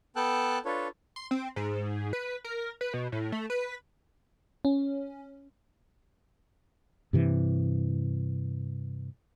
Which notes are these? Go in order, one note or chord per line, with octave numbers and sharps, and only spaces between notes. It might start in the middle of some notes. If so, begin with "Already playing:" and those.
B3 A4 G5 A5 E6 F#6
D4 F4 A4 B4 C#5
C6
C4
G#2
B4
A#4
B4
B2
A2
A3
B4
C#4
G2 C3 E3